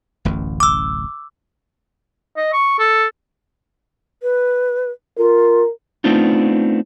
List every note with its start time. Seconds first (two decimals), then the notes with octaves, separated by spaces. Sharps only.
0.25 D1 A1 F#2
0.60 D6 E6
2.37 D#5
2.53 C#6
2.79 A4
4.23 B4
5.18 F4 A#4
6.04 A3 B3 C4 D4 D#4 F4